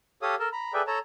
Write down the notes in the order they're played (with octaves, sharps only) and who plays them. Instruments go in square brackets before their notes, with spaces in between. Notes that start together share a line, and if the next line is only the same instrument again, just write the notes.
[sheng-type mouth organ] G4 A4 C#5 F5 D#6
A4 A#4 A5
A#5 B5
G#4 A4 B4 D5 E5 G5
A4 C#5 A5 A#5